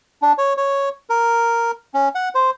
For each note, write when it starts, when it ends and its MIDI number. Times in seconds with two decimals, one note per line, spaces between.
0.22 0.32 62
0.38 0.53 73
0.57 0.89 73
1.10 1.71 70
1.94 2.09 61
2.15 2.29 78
2.35 2.50 72